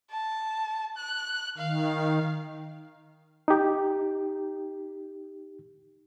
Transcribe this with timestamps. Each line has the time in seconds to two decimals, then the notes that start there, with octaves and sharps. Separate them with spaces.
0.11 A5
0.97 F#6
1.58 D#3 F5
3.48 D#4 G4